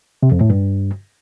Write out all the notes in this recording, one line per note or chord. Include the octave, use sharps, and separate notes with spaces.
C3
F2
A2
G2